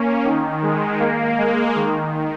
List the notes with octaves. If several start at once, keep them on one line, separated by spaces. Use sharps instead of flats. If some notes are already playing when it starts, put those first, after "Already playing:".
Already playing: A#3 C#4
D#3
G#3
A#3
G#3
D#3